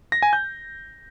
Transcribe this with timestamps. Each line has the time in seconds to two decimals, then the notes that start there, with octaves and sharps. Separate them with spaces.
0.12 A#6
0.22 G#5
0.33 G6